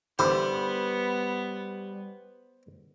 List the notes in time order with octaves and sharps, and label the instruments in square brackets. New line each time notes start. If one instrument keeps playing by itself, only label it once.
[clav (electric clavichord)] D3 E3 B4 [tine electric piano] G3 [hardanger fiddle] B3 [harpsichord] C5